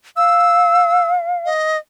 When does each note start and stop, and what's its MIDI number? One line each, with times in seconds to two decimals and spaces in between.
0.17 1.49 77
0.17 1.10 88
1.45 1.77 75